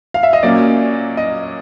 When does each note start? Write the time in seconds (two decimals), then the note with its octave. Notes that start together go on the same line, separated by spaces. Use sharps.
0.14 F5
0.23 E5
0.33 D#5
0.43 A#2 F#3 A#3 C#4 D5
1.17 D#5